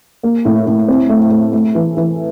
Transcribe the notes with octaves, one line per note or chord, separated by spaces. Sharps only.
A#3
A2
A2
C4
A3
A3
A3
E3
E3